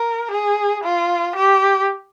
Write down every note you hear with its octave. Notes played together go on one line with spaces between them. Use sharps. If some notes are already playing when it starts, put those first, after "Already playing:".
Already playing: A#4
G#4
F4
G4